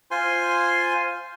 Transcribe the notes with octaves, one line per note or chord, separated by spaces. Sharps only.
F4 C5 G#5 C6